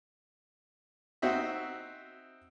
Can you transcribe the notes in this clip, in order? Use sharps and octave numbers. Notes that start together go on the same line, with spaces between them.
C4 D#4 F#4 E5